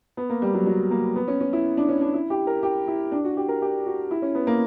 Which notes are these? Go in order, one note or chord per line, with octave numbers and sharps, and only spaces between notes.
B3
A#3
G3
F#3
F#3
A#3
B3
C#4
C#4
E4
D4
C#4
D4
E4
G4
A#4
G4
E4
D4
F#4
G4
A#4
G4
F#4
E4
C#4
B3
A#3